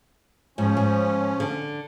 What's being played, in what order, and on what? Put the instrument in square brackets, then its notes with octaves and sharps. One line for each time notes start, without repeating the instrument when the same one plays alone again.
[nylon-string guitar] G#2 [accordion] F3 C#4
[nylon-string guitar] G#2
D3